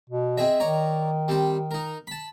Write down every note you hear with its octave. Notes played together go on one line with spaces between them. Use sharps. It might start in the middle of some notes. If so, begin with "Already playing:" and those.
B2
C4 G#4 D#5 E5
D#3 C#5 D5 A#5
G3 C4 C5
D#4 A#4
A5 B5